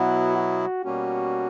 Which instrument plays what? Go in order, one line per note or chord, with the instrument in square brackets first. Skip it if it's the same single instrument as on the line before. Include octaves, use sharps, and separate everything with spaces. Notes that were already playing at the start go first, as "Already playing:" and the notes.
Already playing: [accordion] B2 F#3 B3 E4 [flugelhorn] F#4
[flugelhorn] F#4
[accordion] B2 G3 A#3 C#4 [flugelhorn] F#4